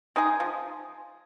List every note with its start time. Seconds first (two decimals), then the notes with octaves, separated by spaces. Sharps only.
0.16 G#3 D#4 G#4
0.40 F3